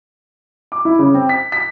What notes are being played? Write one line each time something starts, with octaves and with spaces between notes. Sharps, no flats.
D6
E4
C#3
C4
B6
B6